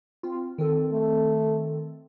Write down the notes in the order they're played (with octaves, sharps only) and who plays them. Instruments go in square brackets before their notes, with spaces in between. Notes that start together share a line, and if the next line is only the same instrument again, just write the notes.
[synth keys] C4 F4
D#3 C4 A4
[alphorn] A3